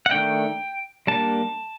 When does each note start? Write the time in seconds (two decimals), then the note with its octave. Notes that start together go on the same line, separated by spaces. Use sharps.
0.06 F#5
0.11 D#3 A3 D4 G5
1.07 G3 A#3 D4 A5